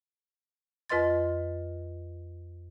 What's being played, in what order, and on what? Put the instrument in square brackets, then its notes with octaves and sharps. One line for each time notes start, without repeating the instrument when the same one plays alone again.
[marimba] F2 F4 B4 D#5 C6 A6